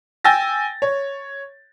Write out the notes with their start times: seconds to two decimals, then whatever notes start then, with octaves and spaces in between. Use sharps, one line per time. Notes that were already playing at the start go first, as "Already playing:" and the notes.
0.24 G5 G#5 E6 A6 A#6
0.82 C#5